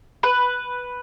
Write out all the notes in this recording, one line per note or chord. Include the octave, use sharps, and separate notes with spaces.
B4